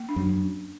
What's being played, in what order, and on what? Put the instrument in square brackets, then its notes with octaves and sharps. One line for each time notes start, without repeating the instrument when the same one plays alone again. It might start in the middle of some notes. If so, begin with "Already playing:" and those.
Already playing: [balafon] A#3
D4
[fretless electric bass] F#2